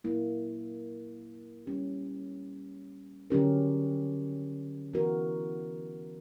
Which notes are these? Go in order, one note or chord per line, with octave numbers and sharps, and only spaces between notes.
A#2 F#3 A#3 E4
G3 C#4 G4
D3 F#3 C#4 G4 A#4
E3 B3 F#4 A#4